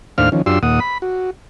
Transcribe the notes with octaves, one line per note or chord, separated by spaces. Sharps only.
D#2 A2 D4 C5 F5 F6
D#3 F3 C#4
F#2 D4 F4 G4 C6 E6
D#2 A#2 F#5 D#6
B5
F#4